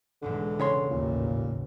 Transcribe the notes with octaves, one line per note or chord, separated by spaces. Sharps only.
E1 B1 G#2 D3 E3 G#3
C#3 C#5 C6
A1 D#2 A#2